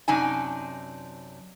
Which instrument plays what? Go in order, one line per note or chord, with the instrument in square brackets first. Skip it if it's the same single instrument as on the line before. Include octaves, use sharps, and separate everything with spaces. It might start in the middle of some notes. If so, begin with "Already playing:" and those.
[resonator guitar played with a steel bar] F#2 C3 D4 D#4 G#5